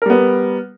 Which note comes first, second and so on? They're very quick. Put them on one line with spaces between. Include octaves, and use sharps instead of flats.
A#4 G3 B3